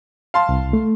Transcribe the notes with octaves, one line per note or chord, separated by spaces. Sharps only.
F5 A5 C6
C2
A3